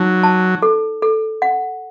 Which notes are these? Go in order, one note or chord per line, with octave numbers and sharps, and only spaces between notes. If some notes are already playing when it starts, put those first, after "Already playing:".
Already playing: F#3 D#4
A5
A4
A4
F#5